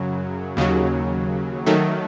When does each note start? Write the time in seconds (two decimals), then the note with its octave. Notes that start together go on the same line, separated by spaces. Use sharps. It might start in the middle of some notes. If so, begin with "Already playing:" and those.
Already playing: F#2 C#3 F#3
0.57 D#2 C#3 F#3
1.66 D#3 F#3 A3